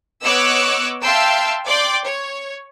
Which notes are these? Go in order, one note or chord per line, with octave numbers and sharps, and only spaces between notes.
B3 C#5 D#5 D6 E6 F#6
E5 F5 G5 A5 C6 E6
D5 G5 C6 D6
C#5